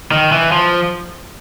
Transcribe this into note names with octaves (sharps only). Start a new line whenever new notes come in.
D#3
E3
F3